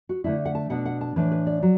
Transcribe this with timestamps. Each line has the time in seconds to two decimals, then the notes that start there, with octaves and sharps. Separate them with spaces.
0.09 F#4
0.24 D3 A3 D4 E4
0.45 F#5
0.55 A5
0.70 B2 B3 D4 F#5
0.85 F#5
1.01 A5
1.16 A2 E3 D4 B4
1.31 B4
1.47 D5
1.62 F#3